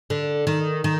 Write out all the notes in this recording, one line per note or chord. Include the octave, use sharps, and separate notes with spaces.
D3
D#3
D#3